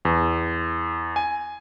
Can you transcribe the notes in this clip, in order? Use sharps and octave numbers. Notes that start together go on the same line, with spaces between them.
E2
G#5